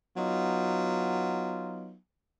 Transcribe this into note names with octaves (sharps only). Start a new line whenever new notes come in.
F#3 B3 D#4 F4